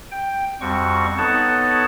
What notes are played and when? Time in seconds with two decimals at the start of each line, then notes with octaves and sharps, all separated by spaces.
0.11 G5
0.61 F2 G3 C4 F#4 C#6
1.18 B3 D#4 A4 C#5 F#5 A5